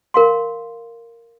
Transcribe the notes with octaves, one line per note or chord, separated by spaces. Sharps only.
A#4 F5 C6